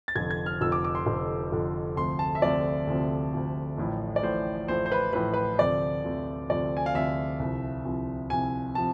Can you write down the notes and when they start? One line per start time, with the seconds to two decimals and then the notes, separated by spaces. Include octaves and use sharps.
0.08 A6
0.15 F1 F2 D3 F3 G#6
0.31 G#6
0.46 F6
0.61 F1 F2 D3 F3 E6
0.72 D6
0.84 D6
0.95 C6
1.06 F1 F2 D3 F3
1.52 F1 F2 D3 F3
1.96 D2 C3 F3 C6
2.19 A5
2.35 E5
2.42 D2 C3 F3 D5
2.87 D2 C3 F3
3.33 D2 C3 F3
3.78 A1 A2 F3
4.16 D5
4.23 A1 A2 F3 C5
4.68 A1 A2 F3 C5
4.86 C5
4.92 B4
5.13 A1 A2 F3 B4
5.34 B4
5.58 D2 C3 F3 D5
6.04 D2 C3 F3
6.50 D2 C3 F3 D5
6.77 G#5
6.86 F5
6.94 D2 C3 F3 E5
7.39 C2 C3 F3
7.85 C2 C3 F3
8.30 C2 C3 F3 G#5
8.75 C3 F3 A5